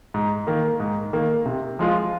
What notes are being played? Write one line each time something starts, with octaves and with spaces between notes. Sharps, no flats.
G#2
D#3 A#3
G#2
D#3 A#3
C3
F3 G#3 F4